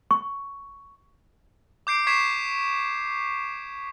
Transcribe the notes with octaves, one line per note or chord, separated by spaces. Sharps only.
C#6
D6 G6 C7 D7
C#6 G#6 B6 C7 E7